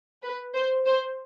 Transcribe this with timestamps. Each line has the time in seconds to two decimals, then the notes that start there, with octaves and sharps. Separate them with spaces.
0.22 B4
0.54 C5
0.86 C5